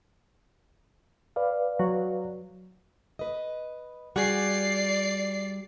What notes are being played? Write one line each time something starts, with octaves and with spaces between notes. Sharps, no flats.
B4 D5 F5
F#3
B4 D#5
G3 F#4 G#4 D5 C7